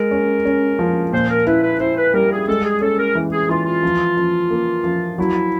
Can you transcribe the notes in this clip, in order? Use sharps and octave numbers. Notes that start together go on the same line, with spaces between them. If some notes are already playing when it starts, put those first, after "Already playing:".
Already playing: G#3 A#4
C#4
C#4
F3
A#2 C5
A#4
E4 B4
B4
E4 C5
B4
G3 A#4
G#4
G#3 A4
G#4
C#4 A4
A#4
E3
G#4
E3 F4
F4
F3
F3
A#3
F3
F#3 E4